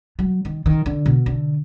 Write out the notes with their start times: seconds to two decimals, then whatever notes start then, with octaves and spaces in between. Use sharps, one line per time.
0.19 F#3
0.45 D#3
0.66 D#3
0.86 D3
1.06 B2
1.26 D3